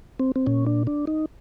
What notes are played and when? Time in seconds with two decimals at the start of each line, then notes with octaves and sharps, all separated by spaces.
0.20 C4
0.36 C4
0.47 A#2 C#4
0.67 D4
0.87 D4
1.07 D#4